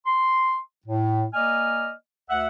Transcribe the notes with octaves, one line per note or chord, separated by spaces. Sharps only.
C6
A2
A#3 D5 D#5 G#5 F6
D2 E5 F#5